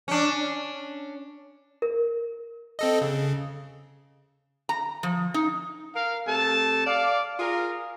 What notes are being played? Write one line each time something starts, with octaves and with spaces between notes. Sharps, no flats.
C#4 D4
A#4
C4 A4 D#5
C#3
A#5
F3
D#4
A#4 F5
C3 A3 A4 A5
D5 F5
F4 G#4 A#4